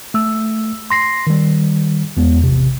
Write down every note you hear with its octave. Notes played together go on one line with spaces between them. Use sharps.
A3 E6
C6 A#6 C7
D#3 G3
E2 G#3 B3
A1 C3